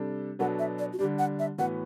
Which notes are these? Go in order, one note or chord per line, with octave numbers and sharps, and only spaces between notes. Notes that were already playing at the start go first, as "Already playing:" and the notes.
Already playing: C3 G3 D4 A4
B2 F#3 B3 D4 A4 F#5
E5
D5
F#4
D3 G3 D4 G4
F#5
E5
A2 E3 B3 F#4 B4 F#5